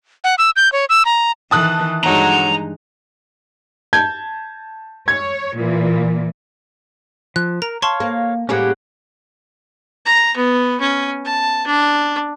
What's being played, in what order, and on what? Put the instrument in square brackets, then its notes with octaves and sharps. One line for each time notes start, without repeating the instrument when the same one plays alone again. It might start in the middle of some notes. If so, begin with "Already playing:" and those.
[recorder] F#5
E6
G6
C#5
E6
A#5
[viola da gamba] D#3 E3 [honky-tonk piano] A5 D#6 F#6
[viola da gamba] G2 G#3 D#4 [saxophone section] D3 F#3 [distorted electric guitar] A#5
[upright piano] A5 G6 G#6
[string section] C#5 [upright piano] G#6
[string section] A#2 E3
[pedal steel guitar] F3 [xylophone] F#6
[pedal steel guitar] A#4 [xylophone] A#5
[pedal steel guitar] C#5 F5 [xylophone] A5 C6 C#6
[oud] A#3
[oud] A2 G3 A#3 [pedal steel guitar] C#4 G#4 F#5
[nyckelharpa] A#5
B3
C#4
A5
D4